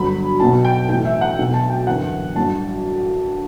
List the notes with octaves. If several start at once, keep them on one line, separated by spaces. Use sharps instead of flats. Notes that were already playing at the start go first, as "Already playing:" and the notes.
Already playing: G1 G2 F#3 B5
B1 B2 F#3 A5
G5
B1 A2 E3 G5
E5
F#5
B1 B2 F#3
A5
G5
G1 F#2 E3 F#5
A1 G2 F#3 A5